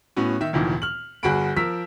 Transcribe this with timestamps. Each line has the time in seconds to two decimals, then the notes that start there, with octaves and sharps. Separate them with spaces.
0.16 A2 B3 C#4 F#4
0.41 D#3 E5
0.53 F1 D2 A#2 D#3 E3
0.82 F6 F#7
1.23 G1 F#4 G#4 F#5 B5 D7
1.57 F3 A#4 E6 B6